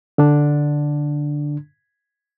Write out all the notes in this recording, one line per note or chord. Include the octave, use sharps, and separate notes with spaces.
D3 D4